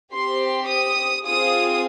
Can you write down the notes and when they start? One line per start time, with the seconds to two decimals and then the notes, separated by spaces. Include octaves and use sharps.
0.13 C4 G4 C6
0.68 D#6
1.23 C4 F4 G#4 D#6